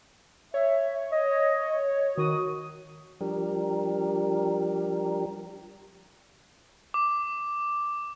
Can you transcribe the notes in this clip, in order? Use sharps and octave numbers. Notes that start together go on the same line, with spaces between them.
C#5 E5
D#5
D#3 F#4 D#6
F3 G3 D4 G4 A#4
D6